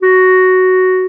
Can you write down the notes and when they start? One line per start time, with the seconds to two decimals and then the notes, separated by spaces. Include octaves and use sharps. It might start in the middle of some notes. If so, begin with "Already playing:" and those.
0.02 F#4